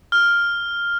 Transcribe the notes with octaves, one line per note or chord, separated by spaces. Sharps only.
F6